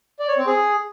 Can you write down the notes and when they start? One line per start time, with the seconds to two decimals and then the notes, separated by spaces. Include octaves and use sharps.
0.19 D5
0.28 C#5
0.37 C4
0.47 G#4